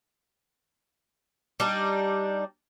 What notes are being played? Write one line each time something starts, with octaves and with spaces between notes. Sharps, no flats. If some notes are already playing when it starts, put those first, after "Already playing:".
G3 D4 D#4